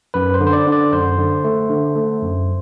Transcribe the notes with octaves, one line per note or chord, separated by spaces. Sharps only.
F#2 B4
C5
D3
C5
D5
D3
D5
F#2 C5
D3
A3
D3
A3
F#2